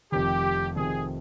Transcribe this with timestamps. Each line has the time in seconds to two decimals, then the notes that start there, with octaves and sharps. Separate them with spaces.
0.12 F1 F2 C3 D#3 G4
0.76 F1 F2 C3 D#3 G#4